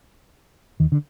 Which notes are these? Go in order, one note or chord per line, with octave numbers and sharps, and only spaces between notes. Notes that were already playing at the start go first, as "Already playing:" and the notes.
D#2 D#3
D3